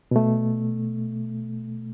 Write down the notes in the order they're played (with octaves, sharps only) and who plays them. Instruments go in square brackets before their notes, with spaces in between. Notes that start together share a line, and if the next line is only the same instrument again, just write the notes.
[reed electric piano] B2 A3